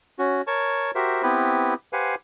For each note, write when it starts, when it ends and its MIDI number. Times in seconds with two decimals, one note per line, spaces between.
0.19 0.41 61
0.19 0.41 66
0.47 0.91 70
0.47 0.91 73
0.47 0.91 81
0.47 0.91 85
0.95 1.22 66
0.95 1.22 67
0.95 1.22 70
0.95 1.22 72
0.95 1.22 76
1.23 1.74 59
1.23 1.74 60
1.23 1.74 64
1.23 1.74 67
1.23 1.74 71
1.93 2.15 67
1.93 2.15 71
1.93 2.15 72
1.93 2.15 77
1.93 2.15 78
1.93 2.15 80